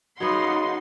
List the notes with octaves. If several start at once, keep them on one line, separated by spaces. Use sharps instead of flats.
D#2 C#3 F#3 B3 D#4 F#5 C6